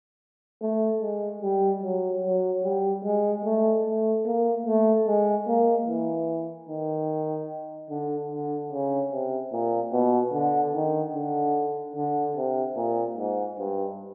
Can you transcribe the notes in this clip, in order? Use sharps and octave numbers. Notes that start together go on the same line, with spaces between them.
A3
G#3
G3
F#3
F#3
G3
G#3
A3
A3
A#3
A3
G#3
A#3
E3
D#3
D3
D3
C#3
C3
A#2
B2
D3
D#3
D3
D3
C3
A#2
G#2
G2